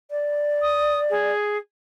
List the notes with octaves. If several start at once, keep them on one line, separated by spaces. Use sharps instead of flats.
D5
D#6
G#4